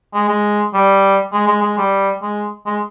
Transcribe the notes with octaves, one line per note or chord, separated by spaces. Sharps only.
G#3
G#3
G3
G#3
G#3
G#3
G3
G#3
G#3